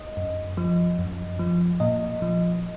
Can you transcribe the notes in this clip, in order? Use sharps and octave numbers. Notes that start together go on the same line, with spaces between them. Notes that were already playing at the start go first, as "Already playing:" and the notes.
Already playing: D#5
F#2
F3
F#2
F3
A#2 D#5
F3